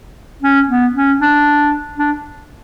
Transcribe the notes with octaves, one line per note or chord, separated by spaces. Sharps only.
C#4
B3
C#4
D4
D4